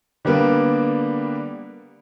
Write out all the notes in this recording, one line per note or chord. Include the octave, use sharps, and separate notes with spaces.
D3 G3 A#3 B3